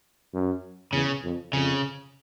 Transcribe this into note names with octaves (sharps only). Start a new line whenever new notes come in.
F#2
E2 C#3
F2
F2 C#3